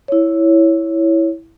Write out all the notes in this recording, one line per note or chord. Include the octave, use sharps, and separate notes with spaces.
E4 C#5